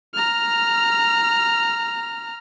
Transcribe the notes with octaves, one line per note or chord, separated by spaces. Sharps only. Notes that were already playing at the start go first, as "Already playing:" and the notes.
A#5 F6